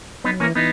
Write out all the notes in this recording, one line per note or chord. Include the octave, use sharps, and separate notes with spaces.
F#3 B3 D#4
E3 A#3 C#4
E3 B3 D#4